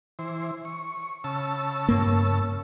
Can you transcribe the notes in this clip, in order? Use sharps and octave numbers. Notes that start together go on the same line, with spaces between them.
E3 C5
C#6
C#3 A5 E6
G2 A#3